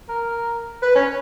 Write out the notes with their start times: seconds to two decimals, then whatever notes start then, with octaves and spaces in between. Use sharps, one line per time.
0.09 A#4
0.82 B4
0.95 C#4